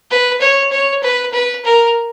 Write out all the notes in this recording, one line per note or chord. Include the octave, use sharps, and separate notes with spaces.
B4
C#5
C#5
B4
B4
A#4